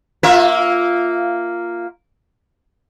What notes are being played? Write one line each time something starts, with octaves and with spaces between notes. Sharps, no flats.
A#3 F4 E5